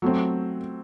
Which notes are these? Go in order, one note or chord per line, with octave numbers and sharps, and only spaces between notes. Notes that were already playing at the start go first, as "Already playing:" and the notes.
F#3 A3 C4